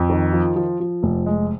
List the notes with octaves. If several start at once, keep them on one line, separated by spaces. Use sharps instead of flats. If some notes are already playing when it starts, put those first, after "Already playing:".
Already playing: F2
D#3
F3
F3
F3
F1
G#3